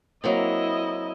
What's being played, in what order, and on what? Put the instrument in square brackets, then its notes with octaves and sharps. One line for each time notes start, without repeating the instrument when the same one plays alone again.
[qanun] F#3 A#3 C4 [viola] E4 D#5